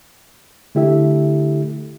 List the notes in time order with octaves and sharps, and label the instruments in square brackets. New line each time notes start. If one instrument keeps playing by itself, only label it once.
[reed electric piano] D3 A3 E4 G4 A4 E5